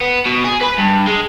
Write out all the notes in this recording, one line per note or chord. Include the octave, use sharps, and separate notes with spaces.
B3
B2
G#4
B4 B5
G2
G#3